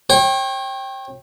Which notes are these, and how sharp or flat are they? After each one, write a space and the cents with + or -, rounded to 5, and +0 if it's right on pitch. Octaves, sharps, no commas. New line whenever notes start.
C#5 -40 G5 +0